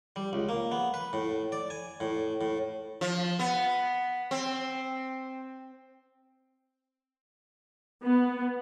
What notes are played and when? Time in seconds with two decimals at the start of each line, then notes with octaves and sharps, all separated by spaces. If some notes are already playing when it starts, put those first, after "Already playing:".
0.16 G3
0.33 C#2
0.49 A#3
0.72 B3
0.94 B4
1.13 A2
1.52 D5
1.70 G#5
2.00 A2
2.41 A2
3.01 F3
3.39 B3
4.31 C4
8.04 B3